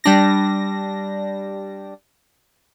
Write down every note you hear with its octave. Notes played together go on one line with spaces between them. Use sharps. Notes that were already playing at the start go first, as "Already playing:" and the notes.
G3 D4 A#6